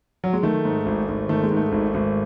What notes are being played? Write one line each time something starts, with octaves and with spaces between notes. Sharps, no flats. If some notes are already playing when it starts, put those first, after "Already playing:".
F#3
G#3
D#3 A3
G#2
G#1
G#1
D#3 A3
G#3
G#2
A3
G#1
G#1